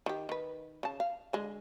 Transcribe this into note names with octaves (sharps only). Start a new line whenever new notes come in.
D#3 G4
D#3 B4
C#3 A5
F5
D3 G#3